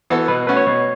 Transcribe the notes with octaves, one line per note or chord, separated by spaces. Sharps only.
E3 B3 F#4 A4
B2 B4
A3 C#4 F#4 B4
C#5
B2